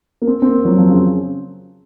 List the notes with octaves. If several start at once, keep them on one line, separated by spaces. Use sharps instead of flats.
A#3
C4
C4
A#3
F#3
F3
C#3